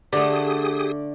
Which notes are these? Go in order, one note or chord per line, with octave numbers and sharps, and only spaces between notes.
D3 A3 G4 G#4 D5 D#6